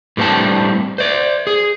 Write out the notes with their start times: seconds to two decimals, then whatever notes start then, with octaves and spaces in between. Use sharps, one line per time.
0.17 A2 G3 C4 D4 A5
0.98 C5 D5
1.47 G#4